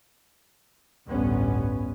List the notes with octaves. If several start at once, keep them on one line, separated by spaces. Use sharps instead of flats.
A1 D2 G2 B3 C#4